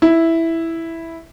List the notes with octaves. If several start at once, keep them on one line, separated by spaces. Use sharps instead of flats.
E4